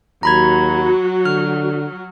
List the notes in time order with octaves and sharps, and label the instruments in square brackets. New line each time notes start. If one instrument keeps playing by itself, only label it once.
[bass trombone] D#2 [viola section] F#3 F#4 [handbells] A#5 B5 G#6
[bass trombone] D3 [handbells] F6